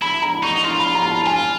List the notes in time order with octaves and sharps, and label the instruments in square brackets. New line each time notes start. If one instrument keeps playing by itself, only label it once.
[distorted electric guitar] E4 [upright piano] B5
[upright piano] A#5
[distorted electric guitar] D#4 [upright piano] C#6
[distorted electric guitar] F4 [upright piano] C6
[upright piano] B5
A#5
A5
[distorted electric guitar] F4 [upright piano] G#5